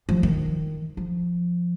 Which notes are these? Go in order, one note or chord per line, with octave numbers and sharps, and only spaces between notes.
F3
D#3
F3